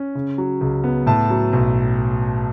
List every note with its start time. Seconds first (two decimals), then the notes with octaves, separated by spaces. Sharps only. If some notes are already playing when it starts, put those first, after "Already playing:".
Already playing: C#4
0.15 C#3
0.38 F#3
0.61 C#2
0.84 B3
1.07 A2 A5
1.30 F#3
1.53 B1